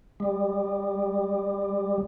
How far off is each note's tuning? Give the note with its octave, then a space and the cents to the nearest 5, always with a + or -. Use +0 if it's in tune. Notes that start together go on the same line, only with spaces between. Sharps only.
G3 +25